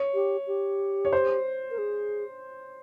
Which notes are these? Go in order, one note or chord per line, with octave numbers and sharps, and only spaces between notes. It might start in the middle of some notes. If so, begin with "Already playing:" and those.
Already playing: C#5
G4
G4
C#5
C5
A#4
G#4